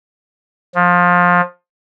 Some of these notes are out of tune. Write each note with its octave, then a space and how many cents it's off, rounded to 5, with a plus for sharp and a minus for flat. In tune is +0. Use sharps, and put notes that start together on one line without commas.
F3 +20